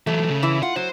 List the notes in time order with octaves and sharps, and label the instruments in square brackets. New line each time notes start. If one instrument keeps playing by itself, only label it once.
[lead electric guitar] E3 F#3 [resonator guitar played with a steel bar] A3
[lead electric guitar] C#3
[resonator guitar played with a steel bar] E3 E4
[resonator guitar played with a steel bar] F4 [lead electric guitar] F#5
[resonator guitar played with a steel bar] F#3 [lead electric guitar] C5